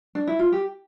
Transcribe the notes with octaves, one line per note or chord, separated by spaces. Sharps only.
D4
E4
F4
G4